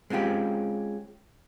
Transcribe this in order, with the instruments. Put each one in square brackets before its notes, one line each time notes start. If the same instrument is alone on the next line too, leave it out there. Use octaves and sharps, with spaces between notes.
[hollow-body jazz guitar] G#3 C4 C#4 F4 G4